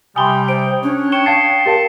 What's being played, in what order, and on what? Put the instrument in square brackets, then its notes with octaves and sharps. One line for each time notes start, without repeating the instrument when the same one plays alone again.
[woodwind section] C3 G3 G5 [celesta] G#5 B5 C6 [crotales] D#6 G7
[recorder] C5 [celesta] D7
[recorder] C#4 [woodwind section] D4 C#5
[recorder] G5 [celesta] C#6 [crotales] C#7 E7 G7
[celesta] F5 A5 A6 [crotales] C7
[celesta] G4 A#4 F5 [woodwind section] A5